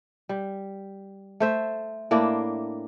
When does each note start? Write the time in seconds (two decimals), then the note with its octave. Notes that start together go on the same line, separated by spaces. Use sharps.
0.29 G3
1.40 A3 C5 E5
2.11 A2 A#3 D4 E4